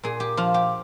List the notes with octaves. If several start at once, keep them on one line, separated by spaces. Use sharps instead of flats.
A#2 G#4
G4
F3 F4
G4